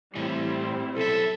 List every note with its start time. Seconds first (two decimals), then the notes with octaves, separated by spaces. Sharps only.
0.15 A2 E3 G3 C4 E4
0.97 B1 A4 E5